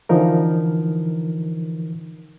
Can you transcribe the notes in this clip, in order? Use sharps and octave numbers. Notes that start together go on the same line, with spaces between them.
D3 E3 F3 D#4 A#4